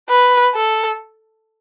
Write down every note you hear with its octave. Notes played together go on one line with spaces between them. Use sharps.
B4
A4